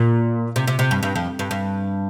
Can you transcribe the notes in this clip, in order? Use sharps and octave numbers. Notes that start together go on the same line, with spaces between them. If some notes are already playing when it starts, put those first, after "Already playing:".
Already playing: A#2
C3
C3
C3
G2
G2
F2
G2
G2